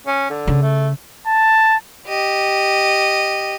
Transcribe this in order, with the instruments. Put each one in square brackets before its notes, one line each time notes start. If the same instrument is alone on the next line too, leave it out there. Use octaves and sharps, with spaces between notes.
[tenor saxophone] C#4
D3
[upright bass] C#3
[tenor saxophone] A3
[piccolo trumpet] A5
[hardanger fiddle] G4 D#5